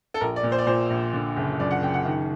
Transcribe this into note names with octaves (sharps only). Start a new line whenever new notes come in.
A4
A#1 A#4
D5
A#2
C5
D5
A#2 C5
A#1
D3
F#1
F#2 D5
F#5
F#1 G5
F#5
D#3